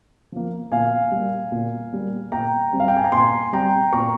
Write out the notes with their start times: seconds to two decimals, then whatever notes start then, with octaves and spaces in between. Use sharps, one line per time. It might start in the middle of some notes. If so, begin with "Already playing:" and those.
0.32 F3 A#3
0.72 A#2 F5 G#5
1.11 G3 A#3
1.52 A#2
1.92 G3 A#3
2.32 A#2 G5 A#5
2.73 G3 C4
2.80 F5
2.88 G5
2.97 G#5
3.04 A#5
3.12 A#2 G#5 C6
3.53 G3 C4 G5 A#5
3.92 A#2 A#5 C#6